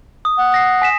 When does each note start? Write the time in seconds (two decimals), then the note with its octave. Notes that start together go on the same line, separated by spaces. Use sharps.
0.25 D#6
0.38 F#5
0.52 D#6 A#6 C7
0.82 G#5 B6 E7